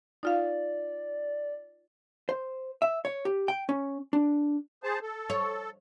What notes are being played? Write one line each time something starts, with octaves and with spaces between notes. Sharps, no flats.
D#4 F4 D5 F5
C5
E5
C#5
G4
G5
C#4
D4
G#4 C5 A5
A4
C#5